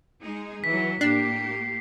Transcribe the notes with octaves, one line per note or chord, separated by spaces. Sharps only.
G#3 D#4 G#4
E3 F#3 B6
A2 A#3 D4 G4 C7